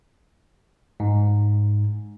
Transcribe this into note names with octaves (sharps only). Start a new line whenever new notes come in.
G#2